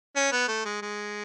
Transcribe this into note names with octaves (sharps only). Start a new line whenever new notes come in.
C#4
B3
A3
G#3
G#3